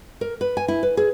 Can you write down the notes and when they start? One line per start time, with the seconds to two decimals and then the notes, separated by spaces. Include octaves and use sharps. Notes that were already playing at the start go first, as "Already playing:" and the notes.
0.21 A#4
0.41 B4
0.57 G#5
0.68 E4
0.83 B4
0.97 G#4